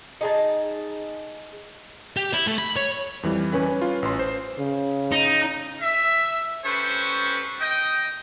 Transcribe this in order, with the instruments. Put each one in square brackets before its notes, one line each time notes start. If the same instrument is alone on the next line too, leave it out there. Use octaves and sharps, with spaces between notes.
[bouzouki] D#4 G#4 A5
[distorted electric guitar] G4
E4
A3
B5
C#5
[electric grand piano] F2 E3 G3
[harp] C#4 B4
[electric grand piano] F4
A1 C6
C5
[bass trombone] C#3
[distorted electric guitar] D#4
[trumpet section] E5
C#4 G4 A4 B4 C5 C#6
D#5 G5